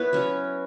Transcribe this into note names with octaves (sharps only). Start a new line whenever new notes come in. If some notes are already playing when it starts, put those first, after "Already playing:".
Already playing: B3 E4 B4 C#5 E5
F#3 C#4